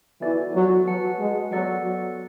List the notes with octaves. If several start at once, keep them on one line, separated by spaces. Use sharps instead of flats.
E3 B3 F#4 A4 D5 G#5
F#3
F#3 F#4 B4 F#5 A5
G#3
F#3 B3 F#4 A4 D5 F#5
F#3